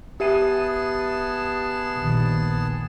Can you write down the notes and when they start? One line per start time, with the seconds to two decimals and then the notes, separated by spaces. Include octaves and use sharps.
0.20 B3 G4 G#4 E5 A5 D#7
1.97 A#1 D#3